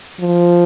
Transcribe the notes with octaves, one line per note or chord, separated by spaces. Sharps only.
F3